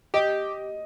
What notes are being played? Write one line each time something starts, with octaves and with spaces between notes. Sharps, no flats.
G4 D#5